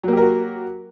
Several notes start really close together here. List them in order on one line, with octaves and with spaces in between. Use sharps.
F#3 A#3 G4 A#4 F#4